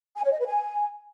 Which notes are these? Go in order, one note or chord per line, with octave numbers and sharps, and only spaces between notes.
G#5
C#5
D#5
B4
G#5